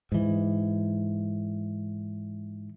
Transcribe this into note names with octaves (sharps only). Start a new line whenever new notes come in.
G#2 E3